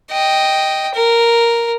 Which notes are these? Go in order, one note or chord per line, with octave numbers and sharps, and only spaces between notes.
D#5 G5
A#4